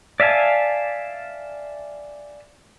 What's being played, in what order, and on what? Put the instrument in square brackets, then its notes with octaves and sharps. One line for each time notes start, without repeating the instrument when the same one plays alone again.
[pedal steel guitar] D5 E5 F5 G#5 A5